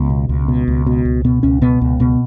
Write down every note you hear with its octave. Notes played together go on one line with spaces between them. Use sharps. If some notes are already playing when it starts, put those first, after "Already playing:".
Already playing: C#2 B3
B2
C#2
B2
C#2
B2
C#2
B2 B3
C#2 C#4
B2 B3
C#2 B3
B2 B3